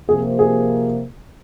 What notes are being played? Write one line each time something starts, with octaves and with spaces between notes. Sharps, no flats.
C3 F3 A#3 G#4
G#4